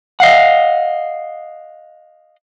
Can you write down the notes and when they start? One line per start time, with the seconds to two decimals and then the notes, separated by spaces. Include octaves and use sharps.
0.20 D#5 F5 F#5